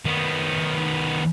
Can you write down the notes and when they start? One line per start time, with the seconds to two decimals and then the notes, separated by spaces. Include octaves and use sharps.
0.06 D#3 B3